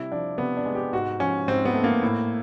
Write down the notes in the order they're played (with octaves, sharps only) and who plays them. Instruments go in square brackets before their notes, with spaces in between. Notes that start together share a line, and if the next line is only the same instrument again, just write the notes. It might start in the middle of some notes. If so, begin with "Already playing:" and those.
Already playing: [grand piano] C3 G3 E4
F3 D4
C3 B3
D4
G#3
G4
G#2 F#4
F3 C#4
G#2 C4
B3
A3
A#3
A2